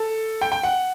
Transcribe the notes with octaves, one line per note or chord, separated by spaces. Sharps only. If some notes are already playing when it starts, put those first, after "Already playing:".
Already playing: A4
G5
G5
F#5